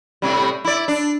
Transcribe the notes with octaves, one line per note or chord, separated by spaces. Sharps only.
A2 C3 G3
E4 D5
D4